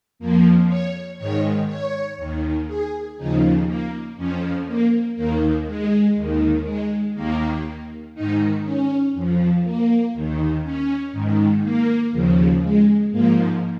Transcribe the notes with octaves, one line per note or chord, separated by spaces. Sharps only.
F2 F3 A#3
C#5
G#2 D#3 C#5
C#5
D#2 D#3
G#4
D#2 C#3 F3 D#4
A#3
F2 F3 C#4
A#3
D#2 D#3 A#3
G#3
D#2 D#3
G#3
D#2 D#3 A#3
G#2 D#3 D#4
C#4
F2 F3
A#3
D#2 D#3
C#4
G#2 D#3
A#3
D#2 C#3 F3
G#3
G#2 F3 A#3